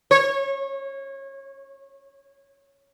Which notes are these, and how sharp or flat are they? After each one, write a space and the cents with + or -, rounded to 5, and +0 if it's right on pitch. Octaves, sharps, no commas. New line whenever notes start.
C#5 -25